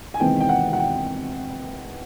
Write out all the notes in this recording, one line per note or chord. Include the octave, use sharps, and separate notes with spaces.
G#5
E2 C3 D#3 G#3 C4 G5
G5
F#5
F#5
G5